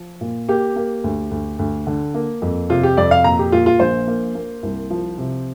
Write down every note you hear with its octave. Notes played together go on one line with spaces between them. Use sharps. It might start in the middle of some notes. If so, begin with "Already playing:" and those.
Already playing: F3
A#2
A#3 G4
A#3
D2
D2
D2
D3
A#3
F2
C3 F4
G4
F2 D5
F5
A#2 A#5
G4
A#2 F4
F4
A#1 C5
A#3
A#3
C2
F3
C3